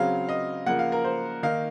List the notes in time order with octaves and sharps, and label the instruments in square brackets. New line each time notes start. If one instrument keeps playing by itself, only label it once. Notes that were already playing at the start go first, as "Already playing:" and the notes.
Already playing: [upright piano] C#3 F#3 C4 F5
D#5
C#3 F3 A#3 F#5
F5
A#4
C5
D#3 A#3 D#4 F5